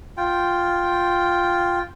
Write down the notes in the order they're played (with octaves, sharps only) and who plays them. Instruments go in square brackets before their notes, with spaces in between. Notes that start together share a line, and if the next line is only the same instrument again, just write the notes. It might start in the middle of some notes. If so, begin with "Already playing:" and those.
[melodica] F4 G5